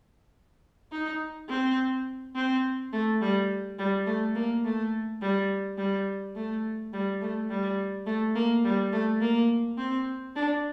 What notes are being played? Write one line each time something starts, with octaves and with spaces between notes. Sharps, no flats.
D#4
C4
C4
A3
G3
G3
A3
A#3
A3
G3
G3
A3
G3
A3
G3
A3
A#3
G3
A3
A#3
C4
D4